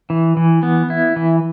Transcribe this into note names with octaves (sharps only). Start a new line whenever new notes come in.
E3
E3
B3
E4
E3